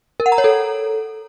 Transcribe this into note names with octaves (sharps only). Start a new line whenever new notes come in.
A#4
F#5
A#5
C#5
A4